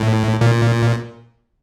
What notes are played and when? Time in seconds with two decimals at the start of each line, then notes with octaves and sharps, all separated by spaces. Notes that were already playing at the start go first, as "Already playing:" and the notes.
Already playing: A2
0.41 A#2